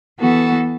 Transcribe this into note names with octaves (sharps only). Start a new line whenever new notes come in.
E3 B3 F#4 A4